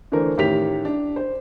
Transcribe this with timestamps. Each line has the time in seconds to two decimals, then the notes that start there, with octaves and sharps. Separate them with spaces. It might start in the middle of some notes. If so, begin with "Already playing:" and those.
0.12 D3 E3 A3 D4 A#4 C5
0.37 A1 D#3 G4 B6 F7
0.85 D4
1.16 C5